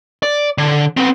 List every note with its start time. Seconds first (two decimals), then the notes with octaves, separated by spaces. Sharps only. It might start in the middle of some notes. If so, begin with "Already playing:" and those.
0.23 D5
0.58 D3
0.97 B3 C4